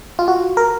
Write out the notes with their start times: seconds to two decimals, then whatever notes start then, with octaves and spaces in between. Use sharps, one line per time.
0.19 F4
0.28 F#4
0.57 A#4